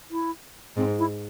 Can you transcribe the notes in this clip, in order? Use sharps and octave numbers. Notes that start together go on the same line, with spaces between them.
E4
G#2 C4
E4